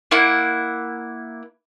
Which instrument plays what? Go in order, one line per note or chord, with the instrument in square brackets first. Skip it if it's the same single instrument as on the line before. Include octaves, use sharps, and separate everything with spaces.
[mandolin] A#3 E4 F#5